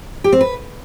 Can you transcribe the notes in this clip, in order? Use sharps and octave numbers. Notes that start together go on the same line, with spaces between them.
G4
C4
B4